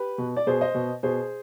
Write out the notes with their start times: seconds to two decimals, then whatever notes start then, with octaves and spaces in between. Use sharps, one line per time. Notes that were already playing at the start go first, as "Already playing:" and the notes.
Already playing: G4 B4
0.18 B2
0.37 D5
0.47 B2 G#4 C5
0.61 C5 D#5
0.75 B2
1.03 B2 G#4 C5